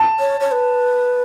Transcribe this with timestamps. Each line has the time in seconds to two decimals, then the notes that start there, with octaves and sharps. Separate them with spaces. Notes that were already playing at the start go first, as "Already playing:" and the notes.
Already playing: A5
0.20 C#5
0.40 C#5
0.52 B4